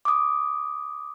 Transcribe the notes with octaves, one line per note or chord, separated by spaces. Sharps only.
D6 D#6